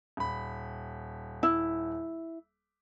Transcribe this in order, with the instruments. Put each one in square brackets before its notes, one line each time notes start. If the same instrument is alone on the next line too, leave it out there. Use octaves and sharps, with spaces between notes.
[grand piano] D#1 B5
[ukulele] E4